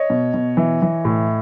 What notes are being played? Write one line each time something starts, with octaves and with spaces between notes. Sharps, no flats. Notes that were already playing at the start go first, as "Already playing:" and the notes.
Already playing: C#5 D#5
B2
B2
E3
E3
A2